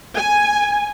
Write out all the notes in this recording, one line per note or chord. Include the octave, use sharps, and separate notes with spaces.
G#5